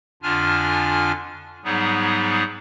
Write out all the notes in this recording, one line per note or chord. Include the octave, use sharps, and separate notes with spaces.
F2 D3 D4 F4 G#5 F6
G#2 F#3 G3 B3 D#4 G#4